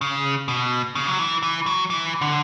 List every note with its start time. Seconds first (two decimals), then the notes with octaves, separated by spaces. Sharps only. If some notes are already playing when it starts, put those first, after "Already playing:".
0.01 C#3
0.48 B2
0.95 C#3
1.07 F#3
1.19 E3
1.43 E3
1.66 F#3
1.90 E3
2.21 D3